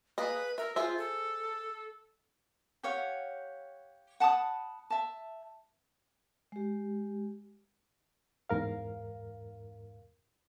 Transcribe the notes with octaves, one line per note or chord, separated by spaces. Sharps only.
A#3 G#4 B4 D#5
A#4 E5
F4 G#4 C5 E5
A4
G4 C#5 F5 F#5
F#5 A5 B5 D#6
E5 A5
G#3 G4
E2 G#2 A#4 F5